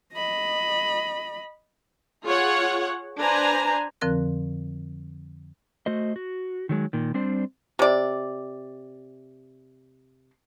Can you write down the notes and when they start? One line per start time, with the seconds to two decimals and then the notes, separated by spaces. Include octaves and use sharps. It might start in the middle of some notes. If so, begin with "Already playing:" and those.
0.13 D#5 B5
2.24 F4 G#4 C#5 F#5
3.19 D4 B4 C5 G#5 A#5
4.01 F2 D3 F3 C4 A#4 F#6
5.86 A3 F#4 C5 D#5
6.16 F#4
6.69 D#3 F#3 G#3
6.93 A#2 D#3
7.14 G3 C4 D4 C5
7.79 C3 D5